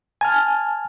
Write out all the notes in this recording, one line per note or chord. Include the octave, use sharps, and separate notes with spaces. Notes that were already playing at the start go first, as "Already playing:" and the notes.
G#5 A5 F6